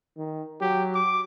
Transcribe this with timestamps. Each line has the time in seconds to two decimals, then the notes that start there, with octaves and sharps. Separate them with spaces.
0.17 D#3
0.61 F#3 G4
0.94 D6